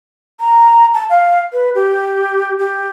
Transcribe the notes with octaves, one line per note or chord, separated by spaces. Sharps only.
A#5
A5
F5
B4
G4
G4